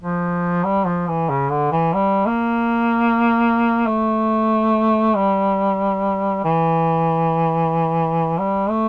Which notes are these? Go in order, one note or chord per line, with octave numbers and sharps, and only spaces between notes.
F3
G3
F3
E3
C#3
D3
E3
G3
A#3
A3
G3
E3
G3
A3